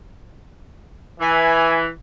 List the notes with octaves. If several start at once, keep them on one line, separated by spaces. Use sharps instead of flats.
E3 G#5